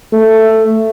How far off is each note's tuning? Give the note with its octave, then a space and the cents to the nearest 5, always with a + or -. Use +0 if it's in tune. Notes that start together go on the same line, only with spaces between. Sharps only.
A3 +10